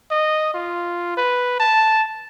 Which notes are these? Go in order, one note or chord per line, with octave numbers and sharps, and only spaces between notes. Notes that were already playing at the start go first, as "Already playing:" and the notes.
D#5
F4
B4
A5